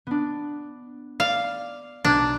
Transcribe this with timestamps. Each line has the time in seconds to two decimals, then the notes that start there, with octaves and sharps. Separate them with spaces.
0.07 B3 D4
1.20 D5 F5
2.05 B1 D4 G#6